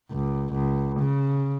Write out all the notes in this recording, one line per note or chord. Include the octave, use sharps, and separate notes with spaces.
C#2
C#2
C#3